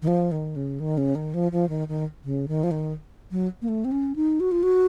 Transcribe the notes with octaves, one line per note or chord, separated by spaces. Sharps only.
D#3
F3
D#3
C#3
D#3
C#3
D#3
F3
F3
D#3
D#3
C#3
D#3
F3
D#3
F#3
A#3
A3
C4
C#4
D#4
F#4
F4
F#4